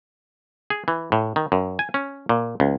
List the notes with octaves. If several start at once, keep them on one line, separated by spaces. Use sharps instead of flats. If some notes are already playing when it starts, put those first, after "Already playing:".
G#4
E3
A2
D#3
F#2
G#5
C#4
A#2
C#2